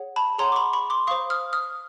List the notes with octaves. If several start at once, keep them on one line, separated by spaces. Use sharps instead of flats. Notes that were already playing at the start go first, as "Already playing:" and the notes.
Already playing: G#4 C#5 F#5
A5 B5
G#4 C#5 F#5 A#5 C6
D6
B5 C#6
B5 C#6
C6 D6
C5 F5 C#6 D#6
D#6 F6
D#6 F6